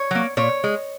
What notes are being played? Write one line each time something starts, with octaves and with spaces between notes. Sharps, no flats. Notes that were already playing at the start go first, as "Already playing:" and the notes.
Already playing: C#5
F#3 A#3
A#2 C#5
G#3